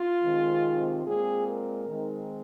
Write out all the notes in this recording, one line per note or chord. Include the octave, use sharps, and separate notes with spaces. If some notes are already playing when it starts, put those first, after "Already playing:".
Already playing: F4
C3 D#3 G#3 C4
A#2 G#3 C4 G#4
A#4
D#3 G#3 C4 D#4